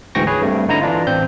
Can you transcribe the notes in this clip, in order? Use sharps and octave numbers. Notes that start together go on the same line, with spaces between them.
D2 G#2 E3 G5 C#6 A#6
G#4 B4 C#5
G2 A3 C4
D3 D#4 E4 A#5 A#6
E3 D4 F4
A1 C4 G6